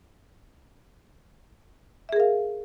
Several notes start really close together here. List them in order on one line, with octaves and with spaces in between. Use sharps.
E5 G#4 A#4 F5